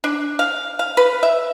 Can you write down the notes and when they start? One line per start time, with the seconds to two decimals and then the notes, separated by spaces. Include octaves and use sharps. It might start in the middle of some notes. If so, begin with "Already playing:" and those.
0.04 D4
0.39 F5
0.79 F5
0.97 B4
1.23 E5